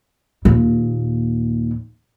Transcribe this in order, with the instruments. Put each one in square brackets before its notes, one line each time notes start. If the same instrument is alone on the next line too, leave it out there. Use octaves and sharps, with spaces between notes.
[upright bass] D#2 A#2